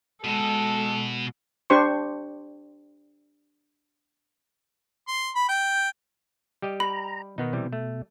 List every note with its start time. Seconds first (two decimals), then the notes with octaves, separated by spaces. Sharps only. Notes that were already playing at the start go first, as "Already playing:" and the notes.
0.24 B2 G#3 A4
1.70 D4 G4 C5 C6 C#6
5.08 C6
5.35 B5
5.49 G5
6.62 G3 G4 D#5
6.80 A#5 B5
7.38 B2 D#3 B3 D#4
7.53 C3 E3 G3
7.73 A3